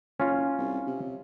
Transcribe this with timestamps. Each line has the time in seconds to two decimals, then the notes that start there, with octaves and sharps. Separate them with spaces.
0.20 F#1 C#4 F4
0.58 C2
0.87 C3